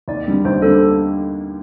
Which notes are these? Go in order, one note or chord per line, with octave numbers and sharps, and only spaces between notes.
D#2 D5
D3 G3 D4
D#2 C5
D3 G3 D4 A4